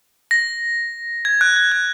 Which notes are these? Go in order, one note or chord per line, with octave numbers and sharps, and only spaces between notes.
A#6
G#6
F#6
G#6
F#6